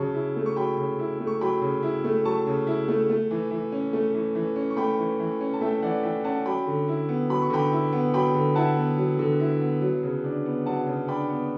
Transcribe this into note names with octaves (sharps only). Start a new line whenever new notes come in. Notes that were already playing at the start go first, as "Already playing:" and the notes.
Already playing: C#3 F#3 A5 C#6
E4
A3
C#6
F#3 G5 B5
C#3
E4
A3
C#6
F#3 G5 B5
C#3
E4
A3
F#3 A5 C#6
C#3
E4
A3
A3
E3
E3
C#4
A3
E3
E3
C#4
C#6
A3 G5 B5
E3
E3
C#4
A5
A3 E5 G5
E3 D5 F#5
E3 E5 G5
C#4 F#5 A5
F#3 G5 B5
D3
E4
B3
F#3 B5
C#6
D3 G5 B5
E4
B3
F#3 G5 B5
D3
E4 F#5 A5
B3
F#3
D3
E4
B3
F#3
C#3
D4
B3
F#3 F#5 A5
C#3
D4 G5 B5
B3